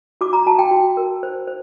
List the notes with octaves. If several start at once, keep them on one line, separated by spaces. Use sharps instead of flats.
F#4 D6
A#5
F#4 A5
G5
F#4
A#4
C5
C5